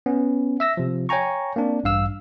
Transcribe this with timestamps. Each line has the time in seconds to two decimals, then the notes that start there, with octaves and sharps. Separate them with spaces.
0.06 B3 C#4
0.60 E5 E6 A#6
0.77 C3 F3
1.09 C#5 G5 G#5 A#5 C#6
1.56 A#3 C4 D4
1.84 A1 G2 F5 E6 F6